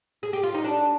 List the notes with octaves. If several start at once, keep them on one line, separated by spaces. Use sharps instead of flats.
G#4
G4
F4
D#4
D4